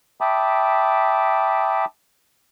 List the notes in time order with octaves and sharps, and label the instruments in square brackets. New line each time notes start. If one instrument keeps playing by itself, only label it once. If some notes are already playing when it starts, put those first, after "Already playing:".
[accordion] E5 G5 A5 B5 D6 D#6